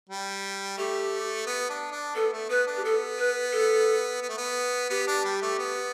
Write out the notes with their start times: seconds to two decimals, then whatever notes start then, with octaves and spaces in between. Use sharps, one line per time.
0.09 G3
0.78 A3 G4
1.46 B3
1.70 D4
1.92 D4
2.15 B3 A4
2.32 A3
2.49 B3 B4
2.67 D4
2.77 G4
2.84 B3 A4
3.18 B4
3.52 A4
4.22 B3
4.29 A3
4.37 B3
4.90 B3 G4
5.07 D4
5.24 G3
5.42 A3
5.59 B3